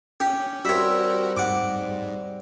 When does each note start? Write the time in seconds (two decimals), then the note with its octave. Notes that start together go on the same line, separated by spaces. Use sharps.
0.20 C#4 G4
0.65 G3 C4 F#4 G4 A#4 C#5 E5
1.37 G#2 F#5 D6